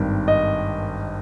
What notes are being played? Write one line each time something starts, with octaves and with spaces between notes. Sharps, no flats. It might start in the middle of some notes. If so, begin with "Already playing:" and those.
Already playing: G#1 G2 D#3
D#5